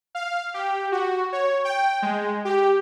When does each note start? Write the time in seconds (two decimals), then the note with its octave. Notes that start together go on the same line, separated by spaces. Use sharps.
0.15 F5
0.54 G4
0.92 F#4
1.32 C#5
1.65 G5
2.02 G#3
2.45 G4